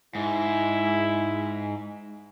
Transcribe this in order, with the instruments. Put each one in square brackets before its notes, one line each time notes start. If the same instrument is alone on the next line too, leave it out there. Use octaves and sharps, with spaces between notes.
[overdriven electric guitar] G#2 [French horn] E4